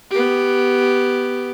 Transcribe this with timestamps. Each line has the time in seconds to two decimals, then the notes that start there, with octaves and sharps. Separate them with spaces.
0.10 B3 G4